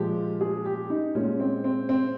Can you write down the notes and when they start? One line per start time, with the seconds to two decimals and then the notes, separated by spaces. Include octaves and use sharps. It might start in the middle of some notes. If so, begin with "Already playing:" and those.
Already playing: A#2 F3 G#3 G4
0.41 G#4
0.65 G4
0.90 D#4
1.15 A#2 G#3 C#4
1.40 C4
1.64 C4
1.89 C4